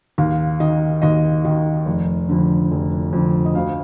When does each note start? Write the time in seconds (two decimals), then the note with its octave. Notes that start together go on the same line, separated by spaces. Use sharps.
0.18 D#2 F5
0.60 D#3 D#5
1.02 D#2 D#5
1.44 D#3 D#5
1.86 F1
2.29 F2 D3
2.71 F1
3.13 F2 D3
3.45 D#5
3.55 D2 F5